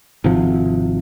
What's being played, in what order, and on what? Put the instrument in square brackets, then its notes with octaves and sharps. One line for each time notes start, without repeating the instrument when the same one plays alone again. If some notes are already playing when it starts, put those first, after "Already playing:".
[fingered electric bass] G#1 C3 F3